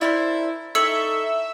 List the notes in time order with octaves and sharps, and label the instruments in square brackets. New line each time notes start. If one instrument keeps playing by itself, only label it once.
[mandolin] D4 A#4 C5 [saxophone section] E4
[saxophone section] D#4 A4 [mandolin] C#5 A#5 [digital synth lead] E5 [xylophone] E6 C#7 F#7